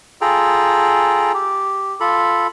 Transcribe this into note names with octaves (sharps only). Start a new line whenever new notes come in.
F4 G#4 A4 G5 A#5
G4
F4 A4 B5